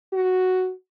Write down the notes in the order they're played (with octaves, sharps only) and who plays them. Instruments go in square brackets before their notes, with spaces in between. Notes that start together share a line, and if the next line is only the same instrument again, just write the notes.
[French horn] F#4